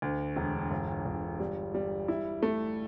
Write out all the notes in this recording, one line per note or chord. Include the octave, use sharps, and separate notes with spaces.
D2
E1
G1
G1
G3
G3
E4
A3